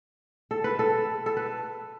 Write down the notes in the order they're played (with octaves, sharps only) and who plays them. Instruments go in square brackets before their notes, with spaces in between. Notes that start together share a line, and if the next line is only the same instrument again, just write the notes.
[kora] A4
B4
A4
A4
B4